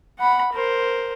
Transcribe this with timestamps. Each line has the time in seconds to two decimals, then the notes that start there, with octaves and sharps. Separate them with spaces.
0.20 F#5 B5
0.53 A#4 C5